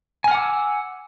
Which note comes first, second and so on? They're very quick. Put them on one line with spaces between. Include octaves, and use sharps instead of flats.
G#5 F6 F#5 D6 E6